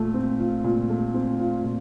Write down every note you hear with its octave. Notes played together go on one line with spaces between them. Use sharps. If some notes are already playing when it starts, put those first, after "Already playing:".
Already playing: A#2 A3
C4
F4
A#2
A3
C4
F4
A#2